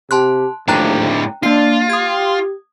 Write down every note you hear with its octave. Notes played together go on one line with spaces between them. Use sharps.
C3 G4 A5 C6 F#6
D#2 A2 F3 A3 D4 G5 A#5 F#6
A#3 D4 F4 C7
G4 D#6 G#6